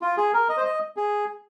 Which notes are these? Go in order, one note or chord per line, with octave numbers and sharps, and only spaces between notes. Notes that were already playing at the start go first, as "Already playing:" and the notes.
F4
G#4
A#4
D#5
C5
D#5
G#4